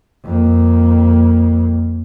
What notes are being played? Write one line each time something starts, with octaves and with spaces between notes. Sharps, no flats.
F2 A#3